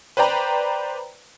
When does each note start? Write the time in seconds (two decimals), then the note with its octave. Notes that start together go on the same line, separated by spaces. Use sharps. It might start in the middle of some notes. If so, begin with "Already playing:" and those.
0.17 B4 C5 D5 G5 A#5 B5